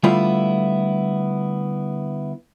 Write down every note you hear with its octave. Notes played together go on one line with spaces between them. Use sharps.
D3 G3 A3 B3 E4 F4